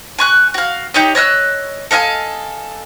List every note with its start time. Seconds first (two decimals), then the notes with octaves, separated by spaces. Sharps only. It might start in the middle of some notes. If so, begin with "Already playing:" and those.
0.18 G#5 C#6 F#6
0.54 F#4 F5
0.94 D#4 G4 C#5 D#5
1.15 C#5 D#5 E6 F#6
1.91 A4 D#5 F5 G#5